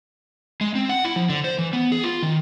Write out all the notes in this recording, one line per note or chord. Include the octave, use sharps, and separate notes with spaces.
G#3
C4
F#5
E4
F3
D3
C5
E3
B3
G#4
F4
D#3